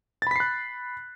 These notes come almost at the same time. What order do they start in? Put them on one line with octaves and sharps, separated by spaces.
A6 B5 B6 C7 F#6